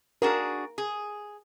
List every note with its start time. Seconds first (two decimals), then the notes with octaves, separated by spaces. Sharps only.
0.22 D4 F#4 G#4 A#4
0.78 G#4